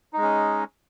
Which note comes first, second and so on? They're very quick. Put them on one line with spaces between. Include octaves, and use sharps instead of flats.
D#4 G#3 C#4